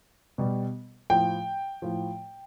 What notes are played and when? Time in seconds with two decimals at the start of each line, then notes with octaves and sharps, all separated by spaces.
0.38 B2 G3
1.10 A2 F3 G5
1.82 A2 F3